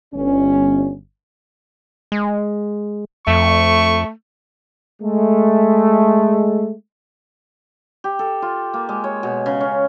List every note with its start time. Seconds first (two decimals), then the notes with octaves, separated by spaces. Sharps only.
0.14 G1 C#4
2.12 G#3
3.28 F2 A3 C#6
5.02 G#3 A3
8.04 G4
8.19 A4
8.42 F4
8.74 A#3
8.89 G#3
9.04 C#5
9.23 B2
9.46 C#3
9.60 C#4